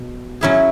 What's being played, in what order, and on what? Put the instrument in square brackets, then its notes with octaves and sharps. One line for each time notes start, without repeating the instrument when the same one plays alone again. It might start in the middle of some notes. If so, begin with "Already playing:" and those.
Already playing: [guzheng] B2
F#3 C#4 E4 G#4